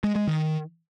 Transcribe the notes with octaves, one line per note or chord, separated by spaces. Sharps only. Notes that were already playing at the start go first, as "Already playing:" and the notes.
G#3
G#3
D#3